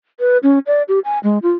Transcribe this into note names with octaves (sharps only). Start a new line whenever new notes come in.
B4
C#4
D5
G4
G#5
G#3
F4